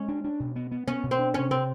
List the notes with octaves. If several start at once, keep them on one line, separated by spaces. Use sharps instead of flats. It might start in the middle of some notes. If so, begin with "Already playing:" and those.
Already playing: G#3 C#4
D4
D4
B2
B3
B3
B3 C#4
B2
C4
D4
C3 C#4
C3 C4